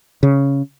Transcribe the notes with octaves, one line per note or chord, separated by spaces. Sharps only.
C#3